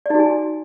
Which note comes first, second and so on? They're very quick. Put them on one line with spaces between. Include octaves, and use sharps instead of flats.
D5 D#4 F#4 G#5